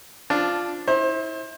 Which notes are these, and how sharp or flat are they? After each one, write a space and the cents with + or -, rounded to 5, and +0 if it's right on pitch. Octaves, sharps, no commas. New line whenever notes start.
F3 +0 D4 +0 F4 +0
E4 -30 C5 +30